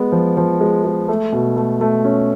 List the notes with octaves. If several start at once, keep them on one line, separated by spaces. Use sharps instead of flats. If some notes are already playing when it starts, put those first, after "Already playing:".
Already playing: G#3 B3
F3
F3
G#3
G#3
A3
B2
A3
A3
C#4